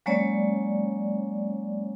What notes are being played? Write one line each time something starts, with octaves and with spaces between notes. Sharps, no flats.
F#3 G#3 A#3 C#4 C#5 D5